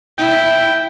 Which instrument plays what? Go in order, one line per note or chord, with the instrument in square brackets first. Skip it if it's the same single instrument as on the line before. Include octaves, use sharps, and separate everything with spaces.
[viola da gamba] E4 [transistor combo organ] G5